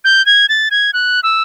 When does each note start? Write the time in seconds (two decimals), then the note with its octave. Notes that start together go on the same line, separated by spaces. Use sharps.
0.04 G6
0.26 G#6
0.49 A6
0.71 G#6
0.94 F#6
1.23 E6